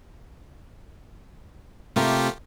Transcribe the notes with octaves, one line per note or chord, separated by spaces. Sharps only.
C3 A3 A#3 F4 G4 A#4